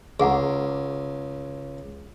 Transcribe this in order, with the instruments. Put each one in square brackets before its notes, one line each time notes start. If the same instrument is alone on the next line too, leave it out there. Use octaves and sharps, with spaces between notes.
[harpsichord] C#2 [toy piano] G#4 F#5 A#5